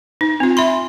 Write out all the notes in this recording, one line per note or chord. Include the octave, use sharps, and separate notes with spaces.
D#4
C4 F4
E5 B5 C6